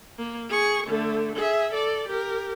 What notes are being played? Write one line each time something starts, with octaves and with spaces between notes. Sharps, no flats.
A#3
G#4 C#6
D3 A3
G#4 E5
A4 D5
G4 A#4